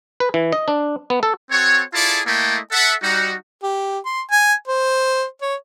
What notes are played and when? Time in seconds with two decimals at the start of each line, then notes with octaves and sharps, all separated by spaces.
0.20 B4
0.34 E3
0.52 D#5
0.68 D4
1.10 B3
1.23 A4
1.51 C4 F#4 A4 C#5
1.94 E4 F4 G#4 A4 D5 A5
2.26 A3 A#3 E4 A4 D#5 G5
2.72 A4 E5 F#5
3.02 G3 D#4 F#4
3.63 G4
4.06 C6
4.31 G#5
4.68 C5
5.42 C#5